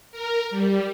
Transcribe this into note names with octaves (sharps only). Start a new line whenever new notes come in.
A#4
G3